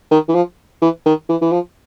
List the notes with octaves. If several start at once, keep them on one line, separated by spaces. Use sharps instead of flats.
D#3
E3
F3
E3
D#3
E3
E3
F3